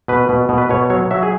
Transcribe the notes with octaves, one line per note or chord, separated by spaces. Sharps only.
B2 B4
B2
B2
B4
B2 C#5
F#3 C#5
F#3 E5
G#4